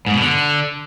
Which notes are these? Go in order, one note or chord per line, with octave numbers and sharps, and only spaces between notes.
G#2
B2
D3